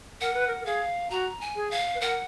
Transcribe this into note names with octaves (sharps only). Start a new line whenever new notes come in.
A#4 F#5
B4
A#4
A#4
G#4 F5
F#4 A#5
G#5
G#4
F5
B4
A#4 F#5